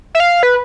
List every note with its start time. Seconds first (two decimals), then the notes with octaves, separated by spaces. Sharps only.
0.15 E5
0.20 F5
0.43 B4